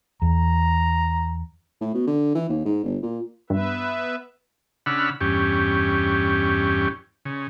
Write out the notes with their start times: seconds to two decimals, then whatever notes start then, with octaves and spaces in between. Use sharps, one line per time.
0.22 E2 A#5
1.81 A2
1.94 B2
2.07 D3
2.35 E3
2.49 D#2
2.66 G#2
2.84 G1
3.03 A#2
3.50 G2 B3 B4 E5
4.86 C#3 D4 F#5 B5 E6 F6
5.21 E2 G2 C#4 G4
7.25 C#3